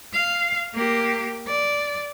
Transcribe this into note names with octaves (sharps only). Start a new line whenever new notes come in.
F5
A#3 G4
D5